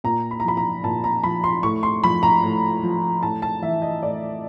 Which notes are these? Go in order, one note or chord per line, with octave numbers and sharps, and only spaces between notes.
A#2 A#5
B5
A#5
F3 B5
A#5
A#2 A5
A#5
F3 B5
C6
A2 C#6
C6
F3 B5
A#5
A2
F3
A2 A5
A5
E3 E5
D#5
A2 D5